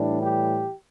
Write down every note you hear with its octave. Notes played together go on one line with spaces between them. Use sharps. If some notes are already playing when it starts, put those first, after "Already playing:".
Already playing: A2 E3 G3 D4
G4